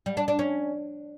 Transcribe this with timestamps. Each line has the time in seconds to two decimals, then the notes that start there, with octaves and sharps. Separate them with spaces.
0.06 G3
0.17 D4
0.28 D4
0.39 C#4